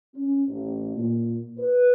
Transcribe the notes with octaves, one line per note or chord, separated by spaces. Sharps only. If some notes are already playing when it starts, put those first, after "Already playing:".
C#4
A1
A#2
B4